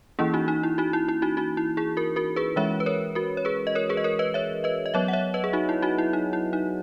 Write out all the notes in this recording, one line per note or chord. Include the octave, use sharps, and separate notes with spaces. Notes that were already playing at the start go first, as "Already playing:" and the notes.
E3 A#3 C#4 E4 G#4
D#4 F#4
D#4
E4
D#4 F#4
E4
E4
D#4 F#4
D#4 F#4
E4
E4 G#4
F#4 A#4
F#4 A#4
G#4 B4
E3 G#3 C#4 C#5 E5
B4
A#4 C#5
F#4 A#4
C#5
G#4 B4
D#5
A#4 C#5
G#4 B4
D#5
A#4 C#5
B4 D#5
C#5 E5
B4 D#5
D#5
F#3 B3 C#5 E5
F#5
C#5 E5
B4 D#5
G#4
D#4 F#4
E4
D#4 F#4
E4
D#4
E4
D#4